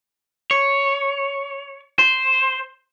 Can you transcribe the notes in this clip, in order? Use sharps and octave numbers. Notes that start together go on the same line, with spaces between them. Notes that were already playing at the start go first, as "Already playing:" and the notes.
C#5
C5